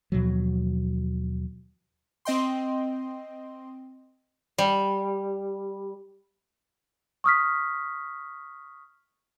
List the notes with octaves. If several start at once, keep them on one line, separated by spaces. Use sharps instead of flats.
D#2 B2 F3 F#3
C4 D#5 G5 C6
G3
C#6 D#6 F6 B6